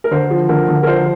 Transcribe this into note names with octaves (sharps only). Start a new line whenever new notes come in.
A#4
D3 C5
F3
D3 A#4
D3
A#4
F3 C5